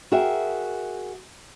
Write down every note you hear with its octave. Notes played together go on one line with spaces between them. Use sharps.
F#4 G#4 A#4 E5 G5